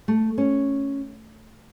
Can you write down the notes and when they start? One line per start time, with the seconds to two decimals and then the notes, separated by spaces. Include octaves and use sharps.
0.08 A3
0.38 C#4